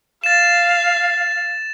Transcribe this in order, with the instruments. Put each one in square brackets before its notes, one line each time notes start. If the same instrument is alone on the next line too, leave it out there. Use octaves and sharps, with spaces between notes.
[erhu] F5 [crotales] A6 E7